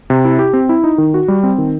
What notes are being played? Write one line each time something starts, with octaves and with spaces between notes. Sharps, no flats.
C3
E4
G4
C4
E4
D#4
D#3
F#4
G3
C4
D#3